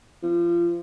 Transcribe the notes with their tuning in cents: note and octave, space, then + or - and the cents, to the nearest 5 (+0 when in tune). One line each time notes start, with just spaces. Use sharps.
F3 -30